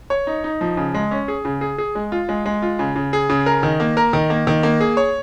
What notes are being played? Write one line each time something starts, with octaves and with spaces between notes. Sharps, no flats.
C#5
D#4
D#4
F3
C#3
G#3
C#4
G#4
C#3
G#4
G#4
G#3
F4
G#3
G#3
F4
C#3
C#3
G#4
C#3
A#4
D#3
A#3
A#4
D#3
A#3
D#3
A#3
G#4
C#5